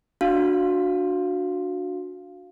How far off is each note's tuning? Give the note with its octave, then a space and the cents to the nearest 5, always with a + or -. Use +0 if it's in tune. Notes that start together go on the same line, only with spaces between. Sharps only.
D4 +0 F#4 -20 F5 +0